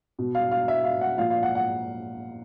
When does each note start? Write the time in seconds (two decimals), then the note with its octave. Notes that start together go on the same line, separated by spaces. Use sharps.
0.19 B2
0.35 F5
0.51 F5
0.68 E5
0.84 F5
1.01 F#5
1.18 A#2 F3 F5
1.30 F5
1.43 F#5
1.55 F#5